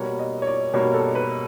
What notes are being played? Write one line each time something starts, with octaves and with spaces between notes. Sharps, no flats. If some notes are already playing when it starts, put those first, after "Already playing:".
Already playing: B2 G3 A#3 C#5
D#5
C#5
D5
B2 G3 A#3 C#5
A4
B4